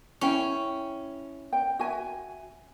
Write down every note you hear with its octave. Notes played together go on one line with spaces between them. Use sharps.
C#4 E4 G5
G5
F#4 E5 G#5